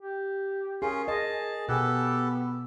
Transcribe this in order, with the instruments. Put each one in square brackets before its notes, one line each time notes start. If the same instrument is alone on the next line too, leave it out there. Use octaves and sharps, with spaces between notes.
[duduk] G4
[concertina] C#4 F4 [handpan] G#4 [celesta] A#4 G#5 C7
[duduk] G#4 [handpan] D#5 [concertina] A5
[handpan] B2 [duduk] B3 [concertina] G4 A4 [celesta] G#5 E6 F#6